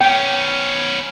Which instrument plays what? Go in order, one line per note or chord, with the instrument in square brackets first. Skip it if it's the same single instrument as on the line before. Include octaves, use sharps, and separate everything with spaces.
[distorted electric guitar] B3 C#4 [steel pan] G5